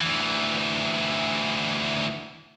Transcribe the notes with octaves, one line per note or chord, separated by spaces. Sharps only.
D2 E3